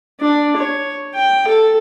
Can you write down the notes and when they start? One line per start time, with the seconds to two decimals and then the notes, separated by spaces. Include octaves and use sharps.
0.20 D4
0.57 C#5
1.14 G5
1.47 A4